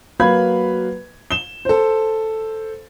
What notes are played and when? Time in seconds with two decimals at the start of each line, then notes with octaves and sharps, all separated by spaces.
0.19 F#3 A#3 B4 F5 B5 G#6
1.31 E7 G7
1.65 A4 C5